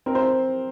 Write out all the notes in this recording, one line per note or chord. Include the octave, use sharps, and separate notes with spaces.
C4 A#4
C5